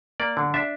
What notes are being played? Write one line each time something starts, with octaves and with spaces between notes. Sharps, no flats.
A#3 D5
D3
D4 E5